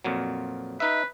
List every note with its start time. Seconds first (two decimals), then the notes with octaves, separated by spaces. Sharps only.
0.05 F2 A#2 F#3
0.80 D#4 B4 E5